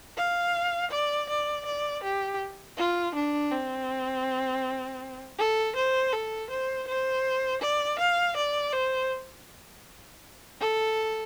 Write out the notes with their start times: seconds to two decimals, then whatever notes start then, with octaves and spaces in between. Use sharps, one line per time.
0.17 F5
0.91 D5
1.29 D5
1.66 D5
2.03 G4
2.78 F4
3.15 D4
3.51 C4
5.38 A4
5.76 C5
6.12 A4
6.50 C5
6.87 C5
7.61 D5
7.99 F5
8.36 D5
8.73 C5
10.60 A4